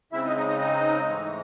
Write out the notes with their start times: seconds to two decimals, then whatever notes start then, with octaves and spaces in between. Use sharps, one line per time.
0.12 C#3 G#3 C4 E4 E5
0.25 D#4 D#5
0.36 D#4 D#5
0.48 D#4 D#5
0.60 D#4 D#5
1.08 G#2 E3 A3